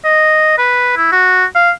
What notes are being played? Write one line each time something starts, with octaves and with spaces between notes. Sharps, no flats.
D#5
B4
E4
F#4
F5